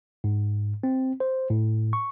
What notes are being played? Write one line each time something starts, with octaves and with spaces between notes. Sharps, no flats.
G#2
C4
C5
A2
C#6